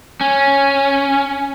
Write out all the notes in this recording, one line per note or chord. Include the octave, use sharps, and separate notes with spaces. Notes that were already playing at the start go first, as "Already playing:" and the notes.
C#4